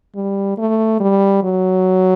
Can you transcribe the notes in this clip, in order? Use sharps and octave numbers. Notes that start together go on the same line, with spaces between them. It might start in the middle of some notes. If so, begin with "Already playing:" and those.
G3
A3
G3
F#3